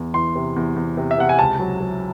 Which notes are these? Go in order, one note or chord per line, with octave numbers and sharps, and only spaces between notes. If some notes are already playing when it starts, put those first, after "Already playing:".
Already playing: E2 E3
E3 C6
C3
E2
E2
C3
E5
C3 F#5
G#5
C#2 A5
F#3
F#3